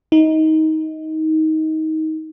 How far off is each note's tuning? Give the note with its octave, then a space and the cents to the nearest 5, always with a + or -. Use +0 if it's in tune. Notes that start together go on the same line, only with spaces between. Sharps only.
D#4 +20